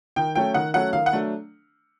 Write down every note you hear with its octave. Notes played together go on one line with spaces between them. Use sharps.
D#3 G5
F#3 A3 C#4 G5
D#3 F#5
F#3 A3 C#4 F#5
D#3 F5
F#5
F#3 A3 D4